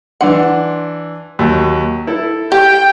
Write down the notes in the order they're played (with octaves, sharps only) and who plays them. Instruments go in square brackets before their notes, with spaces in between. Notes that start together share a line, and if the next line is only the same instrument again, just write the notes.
[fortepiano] E3 D4 C6 [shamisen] F#5
[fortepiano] D#2 F#3
E4 A4
[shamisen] G4 [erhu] G5